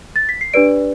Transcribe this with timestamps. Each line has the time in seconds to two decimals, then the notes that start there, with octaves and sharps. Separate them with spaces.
0.16 A6
0.29 B6
0.41 C7
0.54 D4 G4 B4 D5 D7